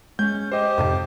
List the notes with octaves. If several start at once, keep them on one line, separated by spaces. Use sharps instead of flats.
G#3 C#4 G6
G4 C5 D#5
F2 G#2 C3